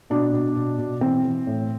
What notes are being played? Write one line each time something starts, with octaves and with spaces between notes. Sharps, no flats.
B2 D4
B2
B2
B2
E3 C4
E3
A2